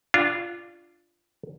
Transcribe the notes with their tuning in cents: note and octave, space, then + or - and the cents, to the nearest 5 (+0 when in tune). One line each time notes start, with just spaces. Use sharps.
D4 +5 F4 -15